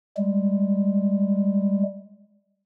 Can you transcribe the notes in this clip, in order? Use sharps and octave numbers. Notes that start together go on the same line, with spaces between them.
G3 G#3